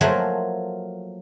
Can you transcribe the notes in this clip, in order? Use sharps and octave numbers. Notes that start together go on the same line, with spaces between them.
F3 F#3 A3 A#3 C5 G#5